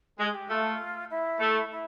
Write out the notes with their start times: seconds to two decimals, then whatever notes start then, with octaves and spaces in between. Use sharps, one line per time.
0.19 G#3 G#4
0.34 G4
0.49 A3 F4
1.10 E4
1.40 A3
1.70 E4